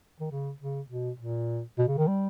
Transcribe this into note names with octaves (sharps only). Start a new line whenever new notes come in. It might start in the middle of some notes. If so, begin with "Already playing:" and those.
D#3
C#3
C#3
B2
A#2
B2
C#3
D#3
G3